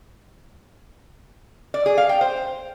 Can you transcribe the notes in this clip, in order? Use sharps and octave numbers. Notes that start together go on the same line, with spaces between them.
D5
G#4
F5
G5
C5